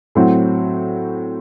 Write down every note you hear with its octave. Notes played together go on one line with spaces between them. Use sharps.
A2 F#3 C4 F#4